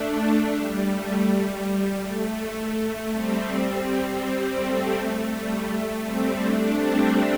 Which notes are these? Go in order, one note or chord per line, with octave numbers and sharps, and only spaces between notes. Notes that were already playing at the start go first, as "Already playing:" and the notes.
Already playing: A3 D4
A3
G3
A3
G3
G3
A3
A3
A3
G3 C4
G3 C4
G3 C4
A3
A3
G3
A3
G3 C4
A3 D4
G3 C4